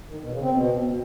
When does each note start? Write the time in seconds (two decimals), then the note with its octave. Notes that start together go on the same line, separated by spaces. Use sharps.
0.09 D#3
0.20 B2
0.31 C#3
0.41 C4
0.52 B2